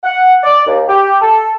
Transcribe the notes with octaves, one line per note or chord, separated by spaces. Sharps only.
F#5
D5
D#2
G4
A4